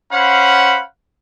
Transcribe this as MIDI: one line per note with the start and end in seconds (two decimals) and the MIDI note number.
0.11 0.79 61
0.11 0.79 72
0.11 0.79 77
0.11 0.79 78
0.11 0.79 83